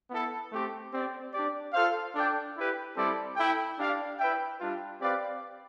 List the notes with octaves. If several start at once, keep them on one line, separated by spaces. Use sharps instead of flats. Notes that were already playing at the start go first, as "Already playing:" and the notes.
B3 E4 A4
A3 C4 G4
C4 G4 D5
D4 G4 D5
F4 A4 C5 F5
D4 A4 D5 G5
E4 G4 B4
G3 C4 E4 A4 D5
E4 A4 E5 G5
D4 G4 D5 F5
E4 B4 E5 G5
G3 D4 F4
C4 G4 B4 D5 F5